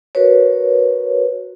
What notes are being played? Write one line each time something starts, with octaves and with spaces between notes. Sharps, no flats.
F#4 A#4 B4 C#5